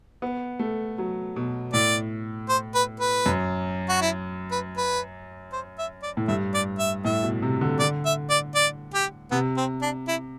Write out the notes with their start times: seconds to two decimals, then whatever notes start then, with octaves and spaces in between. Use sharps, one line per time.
0.22 B3
0.59 A3
0.98 F#3
1.36 B2
1.73 A2 D5
2.49 C5
2.75 B4
3.00 B4
3.26 F#2
3.89 F#4
4.02 E4
4.51 B4
4.77 B4
5.53 C5
5.79 E5
6.03 D5
6.17 A2
6.28 G2 E5
6.54 D5
6.79 E5
7.05 A2 E5
7.23 B2
7.42 C3
7.61 D3
7.79 D3 D5
8.05 E5
8.30 D5
8.55 D5
8.94 G4
9.31 C3 B3
9.57 C4
9.82 D4
10.08 E4